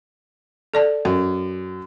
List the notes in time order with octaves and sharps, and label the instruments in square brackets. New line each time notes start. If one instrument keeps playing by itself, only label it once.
[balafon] A4 D5 A5
[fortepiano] F#2